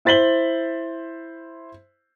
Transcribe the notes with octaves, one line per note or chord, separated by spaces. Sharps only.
E4 C5 A6 B6 F#7 G7